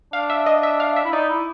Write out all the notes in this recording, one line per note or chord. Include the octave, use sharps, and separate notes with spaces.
D4 F5
E5
D#5
E5
F5
E5
E4
D#4 D5
E4